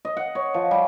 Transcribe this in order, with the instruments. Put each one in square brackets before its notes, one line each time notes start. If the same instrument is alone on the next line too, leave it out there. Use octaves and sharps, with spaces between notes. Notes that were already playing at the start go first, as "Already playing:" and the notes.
[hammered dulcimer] D#5
F#5
C#5
F3
G3